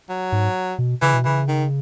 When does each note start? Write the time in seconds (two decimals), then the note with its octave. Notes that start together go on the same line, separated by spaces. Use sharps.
0.09 F#3
0.32 G#2
0.78 B2
1.02 C#3 E3
1.14 B2
1.25 C#3 E3
1.48 D#3